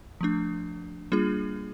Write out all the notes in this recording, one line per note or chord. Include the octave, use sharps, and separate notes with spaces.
F3 A3 D4
G3 A#3 D4 F4 G#4